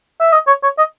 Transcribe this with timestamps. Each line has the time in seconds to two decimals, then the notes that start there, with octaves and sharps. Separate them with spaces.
0.21 E5
0.33 D#5
0.47 C#5
0.63 C#5
0.78 D#5